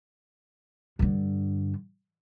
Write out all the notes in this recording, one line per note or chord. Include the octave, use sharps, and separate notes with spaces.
G2 D3